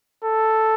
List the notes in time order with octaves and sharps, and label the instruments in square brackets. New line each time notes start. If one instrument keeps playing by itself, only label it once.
[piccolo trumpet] A4